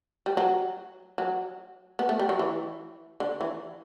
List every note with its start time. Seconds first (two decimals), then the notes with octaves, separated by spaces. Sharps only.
0.26 G3
0.37 F#3
1.18 F#3
1.99 B3
2.09 A3
2.19 G3
2.29 F#3
2.39 E3
3.20 D3
3.41 E3